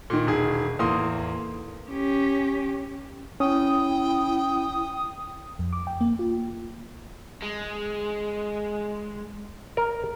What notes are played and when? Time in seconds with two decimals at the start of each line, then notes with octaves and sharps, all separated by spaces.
0.10 A#2 D#3
0.27 E1 D#3 G#4
0.79 E2 A2 A#3 C6 D#6
1.91 C#4 G4
3.40 C#4 E4 G5 D#6
5.59 F2
5.73 D6
5.87 G5
6.01 A#3
6.19 F4
7.42 G#3
9.77 A#4